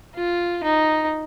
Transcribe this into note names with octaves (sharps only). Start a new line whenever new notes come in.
F4
D#4